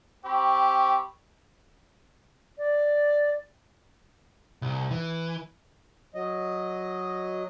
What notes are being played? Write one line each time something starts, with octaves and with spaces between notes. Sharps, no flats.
C4 G4 B5 C#6
D5
C2
E3
F#3 D#5